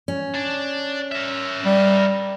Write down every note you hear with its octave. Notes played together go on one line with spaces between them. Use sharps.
C#4
D4
A#4 E5
G3